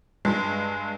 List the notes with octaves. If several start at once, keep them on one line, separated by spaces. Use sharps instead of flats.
G2 G#3